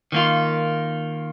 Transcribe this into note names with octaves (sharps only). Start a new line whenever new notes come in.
D#3 A#3 F4